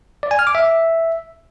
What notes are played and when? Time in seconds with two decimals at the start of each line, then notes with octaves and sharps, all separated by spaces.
0.23 D5
0.31 G#5
0.39 F6
0.47 D6
0.55 E5